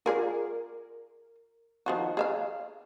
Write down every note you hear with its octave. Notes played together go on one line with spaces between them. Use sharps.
F4 G#4 A#4 D5
D#3 F3 F#4
G#4 E5 F5